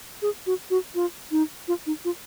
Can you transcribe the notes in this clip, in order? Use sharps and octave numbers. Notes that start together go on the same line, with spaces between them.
G#4
F#4
F#4
F4
D#4
F4
D#4
F4